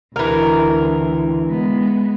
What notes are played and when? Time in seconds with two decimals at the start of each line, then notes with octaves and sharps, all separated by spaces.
0.16 D2 E3 A#4
1.48 G#3 B3